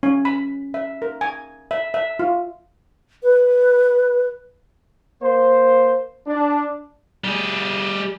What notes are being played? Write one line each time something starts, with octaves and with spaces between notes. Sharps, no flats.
C#4
B5
E5
A#4
G#5
E5
E5
F4
B4
A#3 C5
D4
G3 G#4